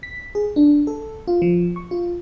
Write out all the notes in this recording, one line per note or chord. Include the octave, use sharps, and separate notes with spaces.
B6
G#4
D4
A4
F4
F3
C#6
F4